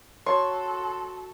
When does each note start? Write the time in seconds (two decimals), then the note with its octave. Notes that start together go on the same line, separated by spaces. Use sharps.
0.26 F#4 A4 C#5 C6